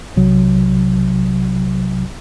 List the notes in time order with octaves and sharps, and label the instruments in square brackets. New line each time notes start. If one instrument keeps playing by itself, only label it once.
[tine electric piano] B1 C3 F#3